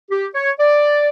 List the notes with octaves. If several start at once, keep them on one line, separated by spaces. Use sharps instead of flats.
G4
C#5
D5